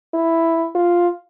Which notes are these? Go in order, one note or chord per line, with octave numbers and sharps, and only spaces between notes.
E4
F4